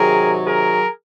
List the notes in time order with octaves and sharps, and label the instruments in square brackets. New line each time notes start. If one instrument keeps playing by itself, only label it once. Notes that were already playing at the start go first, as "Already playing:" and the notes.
Already playing: [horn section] C3 D#3 F#3 G#4 A#4
G#4 A#4